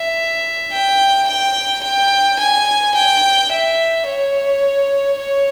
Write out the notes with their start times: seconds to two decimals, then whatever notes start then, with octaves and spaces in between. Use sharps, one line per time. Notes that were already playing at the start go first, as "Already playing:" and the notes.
Already playing: E5
0.71 G5
1.28 G5
1.83 G5
2.39 G#5
2.94 G5
3.51 E5
4.06 C#5
5.17 C#5